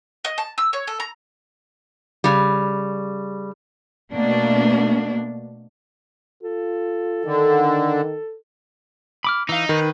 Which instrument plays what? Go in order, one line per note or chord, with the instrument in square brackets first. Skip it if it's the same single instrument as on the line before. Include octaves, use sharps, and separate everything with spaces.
[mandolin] D#5
A5
E6
C#5
A4
A#5
[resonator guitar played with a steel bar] C#3 G3
[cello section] B2 A3 A#3 D4
[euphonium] F4 [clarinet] A4
[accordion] D3 [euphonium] D#3
[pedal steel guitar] B5 D6 F6
[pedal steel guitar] E3 F5 [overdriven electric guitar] D#4
[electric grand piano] D#3 [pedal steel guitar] B4 B5